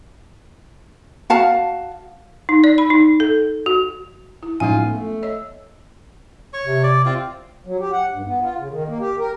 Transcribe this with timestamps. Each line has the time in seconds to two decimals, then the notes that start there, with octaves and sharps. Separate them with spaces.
1.30 F#4 F5 A5
2.49 D#4
2.64 D5
2.78 B5
2.90 D#4
3.20 A4
3.66 F#4
4.43 E4
4.60 A2 F3 F#3 G#3 C#4 D#4 F4 G#5
4.86 A3 B3
5.23 C#5 D#5 E6
6.53 C#5 C#6
6.65 C3
6.83 D5
7.06 C4 F4
7.66 F#3
7.80 G4
7.92 F#5
8.12 G2
8.27 B3
8.42 F4
8.58 C#3
8.71 D#3
8.88 A#3
9.00 G4
9.20 A#4